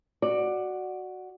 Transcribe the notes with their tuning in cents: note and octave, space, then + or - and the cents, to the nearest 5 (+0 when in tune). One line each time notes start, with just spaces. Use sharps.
F#4 +0 D5 +10